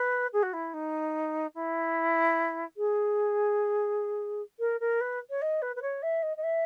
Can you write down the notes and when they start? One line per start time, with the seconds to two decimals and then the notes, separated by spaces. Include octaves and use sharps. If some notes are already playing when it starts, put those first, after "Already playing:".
Already playing: B4
0.33 G#4
0.42 F#4
0.53 E4
0.73 D#4
1.55 E4
2.77 G#4
4.59 A#4
4.80 A#4
5.00 B4
5.30 C#5
5.41 D#5
5.62 B4
5.76 B4
5.82 C#5
6.02 E5
6.22 D#5
6.37 D#5
6.43 E5